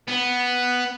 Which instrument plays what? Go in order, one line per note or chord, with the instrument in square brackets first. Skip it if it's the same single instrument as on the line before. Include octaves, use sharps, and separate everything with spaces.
[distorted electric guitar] B3